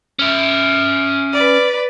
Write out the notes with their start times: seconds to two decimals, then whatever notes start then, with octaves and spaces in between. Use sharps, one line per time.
0.19 C#4 E5
1.33 B4 D5